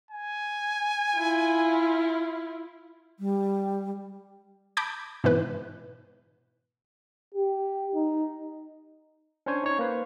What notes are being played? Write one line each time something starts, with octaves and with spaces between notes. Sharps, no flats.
G#5
E4 F4
G3
A5 B5 D6 G6 G#6
G#2 B2 E3 B4
G4
D#4
C#4 D4 C5 C#5 G#5
D#4 C#5
A#3 B4 C5